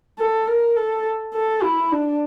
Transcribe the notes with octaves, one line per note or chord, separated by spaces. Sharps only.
A4
A#4
A4
A4
E4
D4